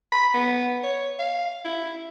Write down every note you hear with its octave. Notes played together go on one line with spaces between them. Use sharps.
B5
B3
C#5
F5
E4